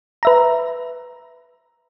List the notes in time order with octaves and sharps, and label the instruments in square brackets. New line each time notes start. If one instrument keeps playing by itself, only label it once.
[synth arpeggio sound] B4 E5 A#5